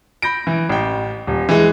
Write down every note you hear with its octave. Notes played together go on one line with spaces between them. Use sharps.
B5 G6 A#6 D7
E3
A1 G5
D#1
E3 G#3